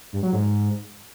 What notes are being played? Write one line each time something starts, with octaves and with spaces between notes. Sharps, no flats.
G2
F#3
G#2